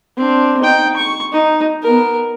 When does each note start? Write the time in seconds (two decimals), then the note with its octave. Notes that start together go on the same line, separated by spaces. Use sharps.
0.17 C4 D4
0.60 D#4 G5
0.97 C#6
1.32 D#4
1.82 B3 A#4